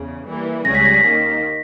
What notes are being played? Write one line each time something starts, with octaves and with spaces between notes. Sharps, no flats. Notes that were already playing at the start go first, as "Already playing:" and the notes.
Already playing: E2 C#3
E3 G3 A#3
C#2 C#3 G3 C#4 G#4 A#6
B6
A#6
B6
D#2 D#3 A#3